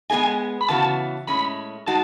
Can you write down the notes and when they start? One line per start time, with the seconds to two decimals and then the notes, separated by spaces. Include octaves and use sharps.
0.10 G#3 B3 D#4 G#4 D#5 G#5
0.61 B5
0.69 C#3 E3 B3 F#4 A5
1.28 A2 G#3 C#4 B5
1.87 G#3 D#4 F#4 A5